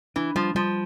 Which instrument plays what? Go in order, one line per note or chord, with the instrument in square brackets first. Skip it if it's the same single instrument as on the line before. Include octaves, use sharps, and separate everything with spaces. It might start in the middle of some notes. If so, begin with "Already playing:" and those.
[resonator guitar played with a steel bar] E3 [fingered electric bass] D4
[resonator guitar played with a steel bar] F3 [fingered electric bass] G3
[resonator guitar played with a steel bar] F3 [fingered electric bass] G3